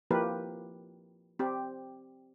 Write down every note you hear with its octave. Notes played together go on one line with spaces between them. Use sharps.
F3 A#3 E4 G4 A#4 B4
C4 G4